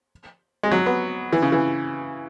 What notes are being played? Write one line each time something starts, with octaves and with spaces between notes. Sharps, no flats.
G#3
F#3
B3
E3
C#3
E3